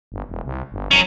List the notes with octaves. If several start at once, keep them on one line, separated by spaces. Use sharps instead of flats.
G1
E1
C2
G1
E1 F#3 C#4